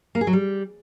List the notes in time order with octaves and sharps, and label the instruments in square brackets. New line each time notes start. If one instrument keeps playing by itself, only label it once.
[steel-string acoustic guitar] A#3
G#4
F#3
G3